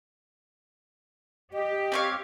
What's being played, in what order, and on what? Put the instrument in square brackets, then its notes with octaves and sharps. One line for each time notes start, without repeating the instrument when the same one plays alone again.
[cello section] G4 [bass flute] D#5
[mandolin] C4 C#5 F5